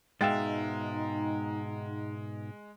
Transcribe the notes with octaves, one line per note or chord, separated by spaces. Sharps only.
G#2 B2 G#3 D#4 E5 F5 G5 A6